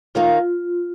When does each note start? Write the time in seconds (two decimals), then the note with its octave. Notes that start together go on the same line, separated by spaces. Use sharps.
0.15 D#2 D#3 A#3 D#4 F4